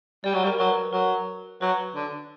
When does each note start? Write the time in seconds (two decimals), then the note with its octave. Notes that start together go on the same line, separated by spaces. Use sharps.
0.24 G3 D5
0.34 F#3
0.44 G3
0.47 A#4
0.59 F#3 A#4
0.70 B4
0.93 F#3 A#4
1.61 F#3 B4
1.95 D3